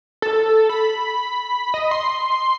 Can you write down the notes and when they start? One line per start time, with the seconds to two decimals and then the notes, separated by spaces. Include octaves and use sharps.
0.22 A4
0.69 B5
1.74 D#5
1.91 C6